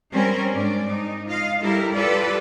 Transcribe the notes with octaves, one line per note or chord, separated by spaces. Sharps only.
G3 C4 C#4 A#4 C5
G#2 D4 D5
D#4
F4 D#5 F5
G3 E4 G4 A4 A#4
F4 G4 A4 B4 D5